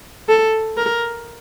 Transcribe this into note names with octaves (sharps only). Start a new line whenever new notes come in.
A4
A#4